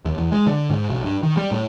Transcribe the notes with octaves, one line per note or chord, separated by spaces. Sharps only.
D#2
E2
G#3
D3
G#2
B1
G2
D#3
G3
A2